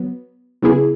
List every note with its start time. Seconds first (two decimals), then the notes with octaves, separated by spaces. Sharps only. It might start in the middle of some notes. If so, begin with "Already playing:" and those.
Already playing: F#3 B3
0.62 C#3 F#3 B3 E4 G#4